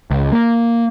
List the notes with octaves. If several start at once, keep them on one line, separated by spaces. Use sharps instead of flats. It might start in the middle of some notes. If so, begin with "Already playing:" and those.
C#2
A#3